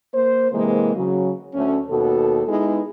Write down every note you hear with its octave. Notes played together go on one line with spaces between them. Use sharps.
A#3 C5
C3 E3 G#3 A#3
C#3 F#3
D2 A3 C#4
D#2 B2 F#4 A4
G#3 B3 D#4 E4 G#4